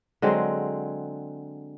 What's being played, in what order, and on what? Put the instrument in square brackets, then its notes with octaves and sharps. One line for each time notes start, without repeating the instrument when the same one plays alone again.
[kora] D3 F#3 G#3 C4